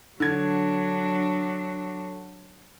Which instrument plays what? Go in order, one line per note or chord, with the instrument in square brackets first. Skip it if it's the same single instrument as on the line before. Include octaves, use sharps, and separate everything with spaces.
[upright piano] D3 G#6 [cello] F#3 D4